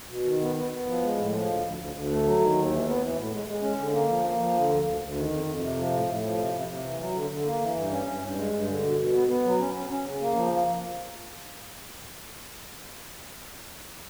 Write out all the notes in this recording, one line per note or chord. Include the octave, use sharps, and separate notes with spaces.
B2
D#3
B3
B3
B3
F3
G#3
A2
F3
D2
D2
D2
D2
A3
F#3
D#3
D#2
E3
B3
E3
A2
G#3
G#3
C#4
D3
A#3
F3
A#3
F3
D3
D2
D2
D2
D#3
F2
F2
C3
F3
A2
A2
F3
C3
C3
C3
E3
F#3
D3
D3
A#3
E3
G2
C#4
G2
G2
G#3
G2
D3
B2
B2
B3
B3
F#3
C#4
C#4
C#4
C#3
A#3
F3